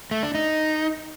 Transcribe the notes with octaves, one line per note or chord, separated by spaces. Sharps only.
A3
D4
D#4